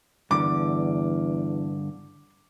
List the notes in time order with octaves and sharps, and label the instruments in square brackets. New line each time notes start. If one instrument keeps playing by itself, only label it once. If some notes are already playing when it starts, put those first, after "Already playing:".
[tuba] E2 [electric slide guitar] G2 D3 [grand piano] D6